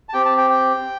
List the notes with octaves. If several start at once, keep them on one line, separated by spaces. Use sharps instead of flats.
A5
C4 G4 G5
A5
G5
G5